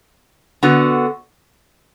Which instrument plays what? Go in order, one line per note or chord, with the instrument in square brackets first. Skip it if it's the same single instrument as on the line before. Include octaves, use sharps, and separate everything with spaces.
[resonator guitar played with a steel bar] D3 B3 F#4